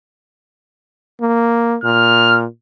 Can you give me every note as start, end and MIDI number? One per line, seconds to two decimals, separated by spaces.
1.21 1.77 58
1.84 2.45 46
1.84 2.39 89